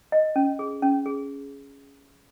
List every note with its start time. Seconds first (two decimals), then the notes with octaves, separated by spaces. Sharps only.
0.12 D#5
0.36 C#4
0.59 G#4
0.82 C#4
1.06 G#4